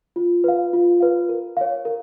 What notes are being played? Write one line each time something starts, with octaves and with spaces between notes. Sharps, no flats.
F4
B4 F5
F4
B4 F5
A#4
C#5 F5
A#4